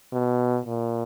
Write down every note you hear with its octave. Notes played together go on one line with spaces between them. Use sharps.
B2
A#2